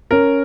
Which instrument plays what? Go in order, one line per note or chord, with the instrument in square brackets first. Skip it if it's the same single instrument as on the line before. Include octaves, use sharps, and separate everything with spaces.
[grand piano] C#4 [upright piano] A#4